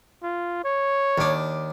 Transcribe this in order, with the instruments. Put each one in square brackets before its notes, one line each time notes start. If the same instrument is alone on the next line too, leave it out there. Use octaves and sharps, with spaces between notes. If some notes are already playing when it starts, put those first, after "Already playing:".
[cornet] F4
C#5
[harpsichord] D#2 D4